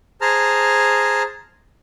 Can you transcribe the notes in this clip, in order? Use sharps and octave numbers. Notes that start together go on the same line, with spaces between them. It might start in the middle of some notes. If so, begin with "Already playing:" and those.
G#4 C5 A5 A#5 F6